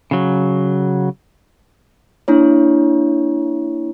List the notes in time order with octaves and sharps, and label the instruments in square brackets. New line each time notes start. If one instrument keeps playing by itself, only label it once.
[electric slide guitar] C#3 F#3
[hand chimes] A#3 D4 E4 C#5